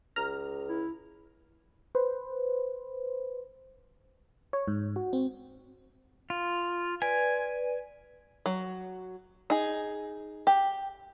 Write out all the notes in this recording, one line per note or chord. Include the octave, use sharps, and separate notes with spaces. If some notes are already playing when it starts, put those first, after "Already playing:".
C#2 A#5 F6
E4
B4 C5
C#5
G#2
F#4
C4
F4
B4 D5 G#5
F#3
D#4 G#4
G4